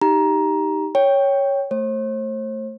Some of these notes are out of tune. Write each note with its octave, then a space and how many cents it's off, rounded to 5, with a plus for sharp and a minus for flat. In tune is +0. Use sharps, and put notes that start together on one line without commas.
D#4 +10 G4 +0 A#5 +15
C#5 +0 G5 +0
A3 +15 C5 +45